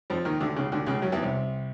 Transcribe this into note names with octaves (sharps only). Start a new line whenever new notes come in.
F2 F3
D#2 D#3
D2 D3
C#2 C#3
D2 D3
C#2 C#3
F#2 F#3
E2 E3
C2 C3